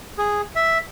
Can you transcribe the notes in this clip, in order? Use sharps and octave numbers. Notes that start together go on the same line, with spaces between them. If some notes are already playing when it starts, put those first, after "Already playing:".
G#4
E5